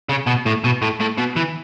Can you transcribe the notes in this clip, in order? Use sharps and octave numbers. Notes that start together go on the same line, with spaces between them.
C#3
B2
A2
B2
A2
A2
B2
E3